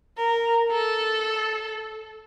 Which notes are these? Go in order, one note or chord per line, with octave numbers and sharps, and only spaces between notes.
A#4
A4